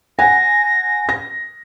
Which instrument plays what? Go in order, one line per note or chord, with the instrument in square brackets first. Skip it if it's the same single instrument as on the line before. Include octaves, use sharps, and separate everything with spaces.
[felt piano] F#5 G#5 [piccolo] A#6
[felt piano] A#6